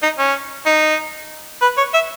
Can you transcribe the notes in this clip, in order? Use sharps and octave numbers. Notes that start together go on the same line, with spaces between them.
D#4
C#4
D#4
B4
C#5
E5